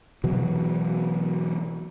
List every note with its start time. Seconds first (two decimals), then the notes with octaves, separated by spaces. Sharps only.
0.24 B2 E3 F#3